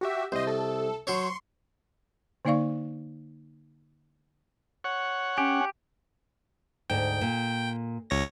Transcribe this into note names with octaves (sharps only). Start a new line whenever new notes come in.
F#4 G4 E5
C2 C5 D#5
A4
F#3 C5 C#5 C6 C#6
D3 A#3 D#4 D5 F5 C#6
C#5 F#5
C#4 G4
D2 G#2 G5
A#2
C#2 C#5 A#6